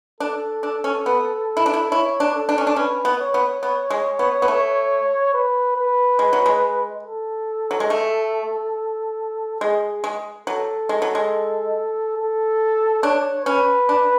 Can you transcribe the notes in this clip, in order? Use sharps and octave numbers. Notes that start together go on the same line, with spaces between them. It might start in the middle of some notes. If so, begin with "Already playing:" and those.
D4 A4
D4
C#4
B3
E4
D4
E4
E4 C#5
D4
A4
D4
C#4
D4
C#4 B4
B3
C#5
B3
B3
G#3
B3
B3
A3
B4
B4
G#3
F#3
G#3
A4
F#3
G#3
A3
G#3 G#4
G#3
F#3 A4
G#3
F#3
G#3
A4
D4 C#5
C#4 B4
D4